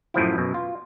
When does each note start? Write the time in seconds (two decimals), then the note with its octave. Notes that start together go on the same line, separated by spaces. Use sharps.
0.14 F#2 A2 F3 E4
0.38 F#2 B2
0.54 F4